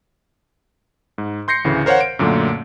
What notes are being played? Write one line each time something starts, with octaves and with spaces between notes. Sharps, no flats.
G#2
C6 G6 A#6 C7 C#7
D2 A2 C#3 E3
A#4 C5 C#5 F5 F#5
D7
F#2 A#2 D3 F#3 A3 A#3